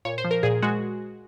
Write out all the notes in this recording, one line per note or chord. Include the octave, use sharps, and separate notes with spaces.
A#2 C#5
C5
F3
A#4
A#2 G#4
G#3 F#4